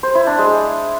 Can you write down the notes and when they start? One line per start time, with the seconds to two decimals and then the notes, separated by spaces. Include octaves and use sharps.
0.03 C5
0.15 E4
0.27 D4
0.39 G#3